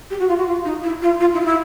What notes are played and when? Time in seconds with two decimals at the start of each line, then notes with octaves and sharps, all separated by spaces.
0.10 G4
0.19 F#4
0.28 F4
0.37 F#4
0.47 F4
0.64 D#4
0.83 E4
1.01 F4
1.20 F4
1.33 E4
1.40 F4
1.45 E4